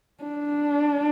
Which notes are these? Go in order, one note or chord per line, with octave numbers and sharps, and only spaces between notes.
D4